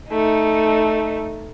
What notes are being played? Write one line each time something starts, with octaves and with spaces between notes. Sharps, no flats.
A3 D#4